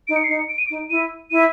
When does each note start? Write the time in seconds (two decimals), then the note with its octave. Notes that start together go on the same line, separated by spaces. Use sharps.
0.08 D#4 D7
0.16 C#7
0.24 C7
0.28 D#4
0.31 C#7
0.49 D7
0.58 D#7
0.67 D7
0.70 D#4
0.90 E4 D#7
1.31 E4 D#7